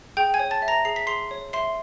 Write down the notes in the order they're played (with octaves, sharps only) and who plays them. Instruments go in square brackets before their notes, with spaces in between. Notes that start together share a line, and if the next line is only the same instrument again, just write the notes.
[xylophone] G#4 G5 G6
G#5 G#6
C#5
A5 A6
E5
A#5 A#6
G#4 C7
B6
G#4 C6 C7
C#5
E5 C6 C7